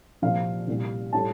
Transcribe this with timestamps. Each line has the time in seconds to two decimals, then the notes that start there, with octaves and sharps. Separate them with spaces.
0.22 C2 A#2 F3 F5
0.67 C2 A#2 G3
1.13 A2 G3 A5